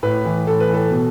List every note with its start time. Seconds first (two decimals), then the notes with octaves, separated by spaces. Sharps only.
0.03 A2 B4
0.25 E3
0.47 A2 A4
0.60 B4
0.69 E3 A4
0.91 B2